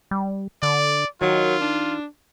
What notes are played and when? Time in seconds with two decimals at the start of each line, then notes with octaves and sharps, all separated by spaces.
0.11 G3
0.62 D3 D5
1.21 D#3 F#3 F4
1.61 D4